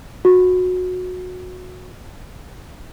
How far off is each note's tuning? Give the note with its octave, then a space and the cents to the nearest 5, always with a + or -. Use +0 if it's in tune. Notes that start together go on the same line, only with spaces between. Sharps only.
F#4 -20